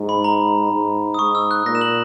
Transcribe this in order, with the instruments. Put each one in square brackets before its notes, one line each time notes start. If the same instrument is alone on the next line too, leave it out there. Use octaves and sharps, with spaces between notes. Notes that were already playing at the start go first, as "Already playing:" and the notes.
Already playing: [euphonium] G#2
[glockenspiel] B5
A#5
[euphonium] G#2
[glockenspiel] D#6
[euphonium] G#2 [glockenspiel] C#6
[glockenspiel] E6
F#6
[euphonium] A#2 [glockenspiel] A#6
[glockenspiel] E7
F#7